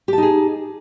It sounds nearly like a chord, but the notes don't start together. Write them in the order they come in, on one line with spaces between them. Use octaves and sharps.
G4 A5 D#4 G#4